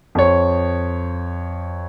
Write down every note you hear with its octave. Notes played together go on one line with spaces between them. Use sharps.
F2 C#5